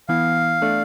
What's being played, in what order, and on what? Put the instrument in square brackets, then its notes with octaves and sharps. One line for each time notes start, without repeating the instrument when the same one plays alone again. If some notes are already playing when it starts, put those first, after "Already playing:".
[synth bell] E3 B3 E4 [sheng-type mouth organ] F5
[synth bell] A3 D4 A4 D5